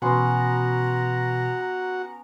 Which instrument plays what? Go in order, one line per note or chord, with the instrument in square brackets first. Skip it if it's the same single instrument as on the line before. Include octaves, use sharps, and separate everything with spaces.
[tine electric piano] B2 E3 [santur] B3 C#4 C6 [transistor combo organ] F#4 F#5 [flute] A#5